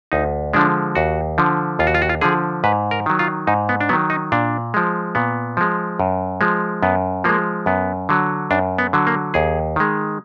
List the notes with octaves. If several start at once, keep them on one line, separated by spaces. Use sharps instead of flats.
D2 D#4
D3 F3 G#3 D4
D#2 F#4
D3 F3
D#2 F4
F#4
F4
F#4
F4
D3 F3 G#4
G#2 B4
A#4
D#3 F#3
F4
G#2 D#4
B3
D4
D#3 F#3 B3
D#4
A#2 D4
F3 G#3
A#2 B3
F3 G#3
F#2
F3 G#3
F#2 B3
F3 G#3 A#3
F#2 B3
D3 F#3
F#2 D4
B3
D3 F#3
A#3
D#2 G#4
D#3 G#3